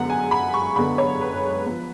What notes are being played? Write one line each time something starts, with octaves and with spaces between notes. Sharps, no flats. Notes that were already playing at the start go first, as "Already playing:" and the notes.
Already playing: F#2 D3 G#3 B3 F#5
G#5
B5
C#6
F#2 D3 G#3 B3 B5
C#5
B4
F3 B3 B4